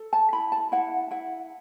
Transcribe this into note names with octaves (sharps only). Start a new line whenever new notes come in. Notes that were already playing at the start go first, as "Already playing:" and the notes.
Already playing: A4
A5
E4 B5
A5
E4 F#5
E4 F#5